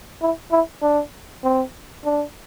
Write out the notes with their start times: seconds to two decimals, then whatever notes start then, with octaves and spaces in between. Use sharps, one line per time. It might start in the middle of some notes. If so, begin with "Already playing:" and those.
0.22 E4
0.52 E4
0.82 D4
1.44 C4
2.05 D4